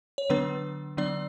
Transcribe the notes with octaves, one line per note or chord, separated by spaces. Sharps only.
C#5
D3 F#3 B3 D4 B4
D3 F#3 B3 D4 D5